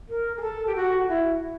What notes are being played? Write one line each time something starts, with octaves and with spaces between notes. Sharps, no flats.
A#4
G#4
A4
G4
F#4
E4